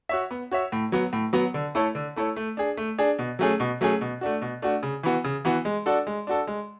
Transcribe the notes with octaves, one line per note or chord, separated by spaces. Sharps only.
F#4 C#5 E5
B3
F#4 C#5 E5
A2
F#3 B3
A2
F#3 B3
D3
A3 E4 A4 C#5
D3
A3 E4 A4 C#5
A3
D4 G#4
A3
D4 G#4
B2
F#3 A3 C#4 G#4
B2
F#3 A3 C#4 G#4
B2
A3 D4 F#4
B2
A3 D4 F#4
C#3
E3 B3 F#4
C#3
E3 B3 F#4
G#3
D4 F#4 A4
G#3
D4 F#4 A4
G#3